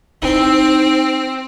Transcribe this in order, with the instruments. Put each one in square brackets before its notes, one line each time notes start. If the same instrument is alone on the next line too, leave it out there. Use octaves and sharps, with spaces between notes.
[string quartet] C4 [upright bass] D#4 E4